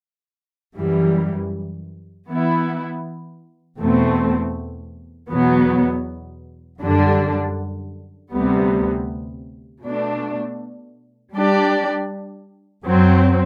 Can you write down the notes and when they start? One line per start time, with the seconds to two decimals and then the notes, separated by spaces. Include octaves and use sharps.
0.78 F#2 E3 G3
2.28 E3 B3 E4
3.79 E2 B2 A3 C4
5.30 E2 B2 F#3 B3
6.81 F#2 D3 G3 D4
8.31 D2 C3 G3 B3
9.82 B2 A3 D4
11.34 G3 D4 G4 D5
12.84 F#2 F#3 C4